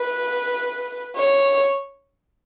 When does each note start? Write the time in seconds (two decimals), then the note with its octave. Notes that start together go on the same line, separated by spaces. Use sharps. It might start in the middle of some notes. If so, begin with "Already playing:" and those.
Already playing: B4
1.16 C#5